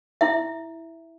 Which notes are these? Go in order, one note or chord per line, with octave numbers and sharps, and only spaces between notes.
E4 E5